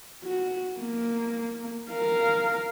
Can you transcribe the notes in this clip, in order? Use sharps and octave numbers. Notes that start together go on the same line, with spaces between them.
F#4
A#3
A#4 F5